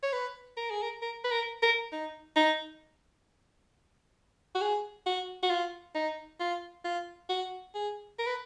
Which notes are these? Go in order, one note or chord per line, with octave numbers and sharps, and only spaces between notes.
C#5
B4
A#4
G#4
A#4
A#4
B4
A#4
A#4
D#4
D#4
F#4
G#4
F#4
F#4
F4
D#4
F4
F4
F#4
G#4
A#4
B4